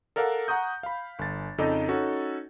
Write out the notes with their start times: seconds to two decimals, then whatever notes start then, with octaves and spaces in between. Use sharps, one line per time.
0.16 A4 A#4 D5 F5 F#5
0.48 F#5 A#5 C#6 D#6 G6
0.83 F5 B5
1.19 G1 A6
1.58 F2 C#3 D#4 A4 D5 D#5
1.89 C#4 D#4 F#4 A4